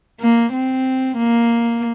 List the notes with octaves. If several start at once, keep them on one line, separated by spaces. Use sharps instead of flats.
A#3
C4
A#3